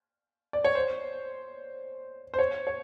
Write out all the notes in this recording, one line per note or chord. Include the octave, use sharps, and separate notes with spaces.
D5
C#5
C5
C5
C#5
C#5